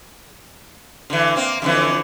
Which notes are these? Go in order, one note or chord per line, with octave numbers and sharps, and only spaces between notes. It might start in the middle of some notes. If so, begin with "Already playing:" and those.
D3 E3
A#3 C4
F2 D3 E3